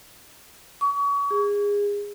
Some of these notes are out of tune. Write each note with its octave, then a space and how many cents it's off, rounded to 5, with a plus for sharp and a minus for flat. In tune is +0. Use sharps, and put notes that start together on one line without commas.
C#6 +35
G#4 -25